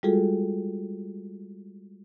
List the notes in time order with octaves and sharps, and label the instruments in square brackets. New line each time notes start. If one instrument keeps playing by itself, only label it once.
[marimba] G3 G#3 F4 F#4 G#4 A4